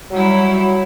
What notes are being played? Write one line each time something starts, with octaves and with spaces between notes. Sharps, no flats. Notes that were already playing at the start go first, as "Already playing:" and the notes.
F#3 G3 E4